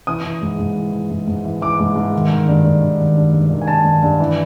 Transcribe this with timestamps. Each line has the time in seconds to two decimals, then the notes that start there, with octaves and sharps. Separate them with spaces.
0.07 E3 D#6
0.24 E3
0.42 G#2
0.59 G#2
0.76 E3
0.93 E3
1.10 G#2
1.28 G#2
1.45 E3
1.62 E3 D6
1.79 G#2
1.96 G#2
2.13 D#3
2.30 D#3
2.48 G2
2.65 G2
2.82 D#3
3.00 D#3
3.17 G2
3.33 G2
3.51 D#3
3.61 G#5
3.68 D#3 A5
3.85 G2
4.03 G2
4.20 E3